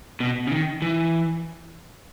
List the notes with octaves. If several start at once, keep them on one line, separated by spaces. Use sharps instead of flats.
B2
C#3
D#3
E3